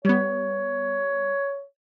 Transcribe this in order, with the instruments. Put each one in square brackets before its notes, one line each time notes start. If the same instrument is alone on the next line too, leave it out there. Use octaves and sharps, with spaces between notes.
[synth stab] G3 B3 [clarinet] C#5